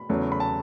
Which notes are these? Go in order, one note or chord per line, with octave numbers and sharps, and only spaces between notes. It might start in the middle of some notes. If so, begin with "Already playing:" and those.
Already playing: B5
E2 C#3 F#3 A3
B5
A5